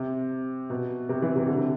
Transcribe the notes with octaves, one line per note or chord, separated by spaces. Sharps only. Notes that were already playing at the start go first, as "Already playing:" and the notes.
Already playing: C3
B2
C3
E3
C3
D3
C3